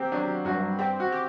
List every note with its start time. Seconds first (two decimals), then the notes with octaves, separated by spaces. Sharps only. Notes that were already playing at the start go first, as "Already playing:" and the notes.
Already playing: A#3 C4 G4
0.12 F#3 D4
0.45 G2 F#4
0.79 C4 G4
1.00 F#4
1.12 G4